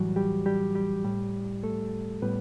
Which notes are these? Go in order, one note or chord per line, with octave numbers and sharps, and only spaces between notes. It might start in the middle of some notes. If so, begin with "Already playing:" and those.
Already playing: A2 E3 F#3 G3 F#4
G3 G4
G3 G4
G3 G4
A2 G3
A3 A4
A2 G3 B3 B4